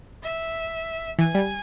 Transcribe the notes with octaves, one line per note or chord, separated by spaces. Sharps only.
E5
E3 G#5
G3